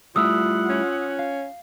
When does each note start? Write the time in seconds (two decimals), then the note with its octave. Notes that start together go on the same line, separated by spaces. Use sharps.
0.16 G3 A3 E4 F4 F#5 D#6 E6
0.70 C#4
1.19 F5